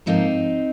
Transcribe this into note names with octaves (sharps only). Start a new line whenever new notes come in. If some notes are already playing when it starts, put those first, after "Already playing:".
G#2 F3 A#3 C4 D#4